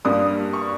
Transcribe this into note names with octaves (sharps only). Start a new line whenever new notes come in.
G2 G3 A#3 D#6
C#6